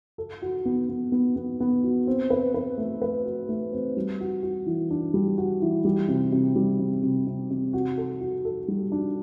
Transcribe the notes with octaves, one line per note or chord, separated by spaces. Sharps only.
A4
F#4
B3
B3
B3
B3
B3
F#4
C4
B4
B4
A3
B4
F#4
A3
C4
G3
F#4
F#4
E3
D4
G3
F#4
E3
G3
C3
C3
G3
C3
C3
C3
C3
F#4
A4
F#4
A4
G3
D4